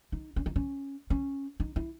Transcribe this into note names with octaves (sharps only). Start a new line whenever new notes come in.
D#4
C#4
D#4
C#4
C#4
D#4
E4